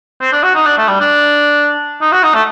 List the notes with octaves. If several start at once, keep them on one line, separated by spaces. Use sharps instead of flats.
C4
D4
F#4
D#4
D4
A3
G3
D4
D#4
F#4
D#4
A3